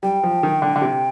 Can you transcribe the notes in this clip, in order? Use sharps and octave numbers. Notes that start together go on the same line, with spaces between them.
G3 G5
F3
D#3
D3
D3
C3